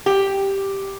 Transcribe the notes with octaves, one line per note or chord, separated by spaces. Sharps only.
G4